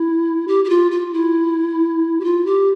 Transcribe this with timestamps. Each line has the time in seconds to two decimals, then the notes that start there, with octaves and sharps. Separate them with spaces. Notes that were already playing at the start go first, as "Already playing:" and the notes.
Already playing: E4
0.48 G4
0.65 G4
0.70 F4
0.91 F4
1.13 E4
2.20 G4
2.24 F4
2.46 G4